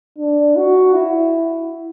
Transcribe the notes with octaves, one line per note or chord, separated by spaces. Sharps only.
D4
F#4
E4